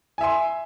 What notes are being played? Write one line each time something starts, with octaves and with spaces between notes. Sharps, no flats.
E5 G#5 C6